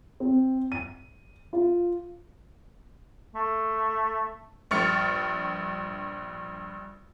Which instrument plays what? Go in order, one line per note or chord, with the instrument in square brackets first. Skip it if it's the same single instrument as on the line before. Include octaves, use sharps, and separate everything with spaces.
[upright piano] C4
D#7
F4
[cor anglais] A3
[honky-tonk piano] A#1 G2 C#6 F6 A6 C#7